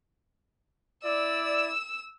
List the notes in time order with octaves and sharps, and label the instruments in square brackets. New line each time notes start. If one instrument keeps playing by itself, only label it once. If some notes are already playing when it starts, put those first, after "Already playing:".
[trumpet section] E4 D5 [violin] E6